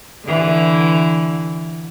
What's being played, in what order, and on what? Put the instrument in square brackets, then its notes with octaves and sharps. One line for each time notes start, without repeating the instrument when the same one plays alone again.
[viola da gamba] D3 E3